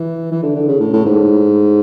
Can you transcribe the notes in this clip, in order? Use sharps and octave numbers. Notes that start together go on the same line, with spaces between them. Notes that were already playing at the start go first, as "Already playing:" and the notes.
Already playing: E3
E3
D3
D3
C#3
A2
A2
G#2